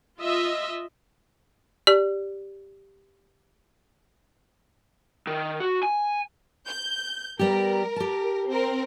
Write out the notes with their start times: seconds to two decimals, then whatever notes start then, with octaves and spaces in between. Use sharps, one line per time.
0.21 F4 D#5 E5
1.87 G4 D5
5.27 D#3
5.60 F#4
5.83 G#5
6.67 G6
7.39 G3 B3 G4 A#4
7.96 G4 A5
8.48 C4 A#4